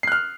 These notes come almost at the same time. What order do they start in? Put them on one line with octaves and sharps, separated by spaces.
C7 F#6 F6